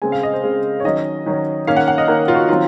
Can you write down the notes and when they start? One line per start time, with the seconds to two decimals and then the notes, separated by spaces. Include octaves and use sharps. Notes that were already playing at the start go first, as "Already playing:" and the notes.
0.02 C#3 G#3 C4 G#5
0.12 F5
0.23 D#5
0.33 C5
0.43 C#3 G#3 C4
0.80 C#5
0.84 D#3 F#3 C#4 D#5
1.26 D#3 F#3 C#4
1.67 D#3 A#3 C#4 F5
1.77 F#5
1.88 F#5
1.98 D#5
2.08 D#3 A#3 C#4 A#4
2.28 F4
2.35 F#4
2.49 D#3 F#3 C4 F4